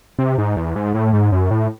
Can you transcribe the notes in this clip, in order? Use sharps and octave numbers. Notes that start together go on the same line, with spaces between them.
C3
G#2
E2
G#2
A2
G#2
F#2
A2